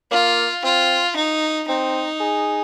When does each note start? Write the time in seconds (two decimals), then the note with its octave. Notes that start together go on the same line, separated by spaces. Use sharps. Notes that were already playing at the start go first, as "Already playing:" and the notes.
0.11 A#3 F4
0.64 C4 F4
1.16 D#4
1.68 C4 D#4
2.20 G#4